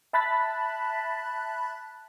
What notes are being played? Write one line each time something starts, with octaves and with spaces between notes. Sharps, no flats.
E5 A5 B5 F#6 A6 B6